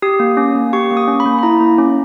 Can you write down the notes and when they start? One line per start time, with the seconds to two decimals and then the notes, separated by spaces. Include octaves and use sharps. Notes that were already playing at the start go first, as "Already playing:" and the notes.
0.02 G4 D#6
0.20 A#3
0.37 C#4
0.55 A#3
0.73 G4 C#6
0.91 A#3
0.97 D#6
1.08 C#4
1.20 B5
1.26 A#3
1.39 B5
1.43 E4 A#5
1.60 A#3
1.78 C#4